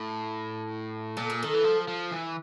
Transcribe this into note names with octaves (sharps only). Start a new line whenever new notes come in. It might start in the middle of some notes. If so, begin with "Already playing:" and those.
Already playing: A2
A#2 A4
G#4
D#3 A4
E3
F3
F3
E3